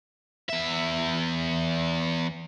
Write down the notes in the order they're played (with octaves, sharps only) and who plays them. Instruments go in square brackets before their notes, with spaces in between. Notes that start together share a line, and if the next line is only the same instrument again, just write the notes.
[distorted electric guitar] E2 E5